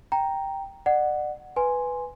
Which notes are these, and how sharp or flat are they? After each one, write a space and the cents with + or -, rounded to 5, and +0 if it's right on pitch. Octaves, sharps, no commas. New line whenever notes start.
G5 +0 A#5 +0
D5 +35 F#5 +0
B4 +5 G#5 +0 C6 +0